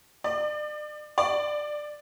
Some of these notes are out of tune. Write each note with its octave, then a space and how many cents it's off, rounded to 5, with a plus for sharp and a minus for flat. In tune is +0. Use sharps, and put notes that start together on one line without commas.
D5 +40
D5 +15